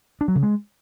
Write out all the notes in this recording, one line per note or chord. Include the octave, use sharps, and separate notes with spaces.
D4
F#3
C#3
G#3